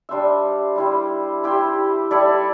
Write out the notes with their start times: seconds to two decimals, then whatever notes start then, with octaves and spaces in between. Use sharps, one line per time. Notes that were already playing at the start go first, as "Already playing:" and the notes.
0.09 G3 D4 C5 E5
0.76 G3 E4 G4 C5
1.44 E4 G4 C5
2.11 G3 E4 A4 D5